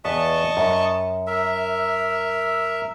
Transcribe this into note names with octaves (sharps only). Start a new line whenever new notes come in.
E2 B4 D#5 A5 C#6
F#2
A#4 E5